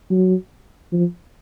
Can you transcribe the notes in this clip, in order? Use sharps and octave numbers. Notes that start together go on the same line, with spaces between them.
F#3
F3